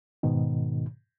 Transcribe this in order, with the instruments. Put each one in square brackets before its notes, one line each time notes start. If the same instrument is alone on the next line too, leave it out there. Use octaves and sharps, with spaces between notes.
[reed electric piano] G#2 B2 D#3